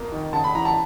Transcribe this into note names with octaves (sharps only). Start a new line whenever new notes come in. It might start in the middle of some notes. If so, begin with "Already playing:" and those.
Already playing: F2 A#3
D#3
C#3 A5
B5
E3 A#5
A5